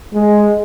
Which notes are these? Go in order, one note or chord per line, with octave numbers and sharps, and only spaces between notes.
G#3